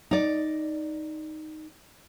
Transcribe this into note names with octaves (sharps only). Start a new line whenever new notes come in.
D#4 D5